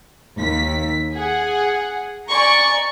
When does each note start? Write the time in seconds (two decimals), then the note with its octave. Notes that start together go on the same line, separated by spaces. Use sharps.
0.40 D#2 B6
1.14 G#4 F#5
2.29 D5 G#5 A#5 C#6